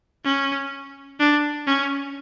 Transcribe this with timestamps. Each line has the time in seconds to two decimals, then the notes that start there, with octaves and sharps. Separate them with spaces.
0.25 C#4
1.20 D4
1.67 C#4